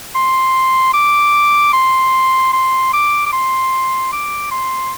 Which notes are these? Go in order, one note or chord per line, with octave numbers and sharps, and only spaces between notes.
C6
D6
C6
C6
D6
D6
C6
D6
C6